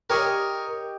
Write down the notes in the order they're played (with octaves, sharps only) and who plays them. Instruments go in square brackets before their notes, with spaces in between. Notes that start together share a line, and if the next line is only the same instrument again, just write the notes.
[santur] G4 D#5 [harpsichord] A#4 C#5 G#5